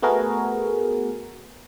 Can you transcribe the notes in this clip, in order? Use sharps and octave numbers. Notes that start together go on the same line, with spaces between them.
A3 B3 F#4 G#4 A#4